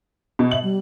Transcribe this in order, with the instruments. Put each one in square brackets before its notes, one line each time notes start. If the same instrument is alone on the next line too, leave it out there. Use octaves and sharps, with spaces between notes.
[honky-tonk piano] B2
[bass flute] E5 [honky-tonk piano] F#7
[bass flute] G3